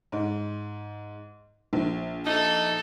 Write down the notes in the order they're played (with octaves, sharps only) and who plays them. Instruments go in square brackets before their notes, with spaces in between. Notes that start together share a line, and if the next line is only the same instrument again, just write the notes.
[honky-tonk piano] G#2
A#1
[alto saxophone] D#4 [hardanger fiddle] A4